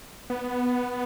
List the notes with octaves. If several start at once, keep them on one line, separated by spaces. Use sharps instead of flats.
B3